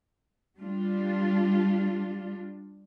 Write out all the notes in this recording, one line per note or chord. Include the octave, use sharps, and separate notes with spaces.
G3 D4 F4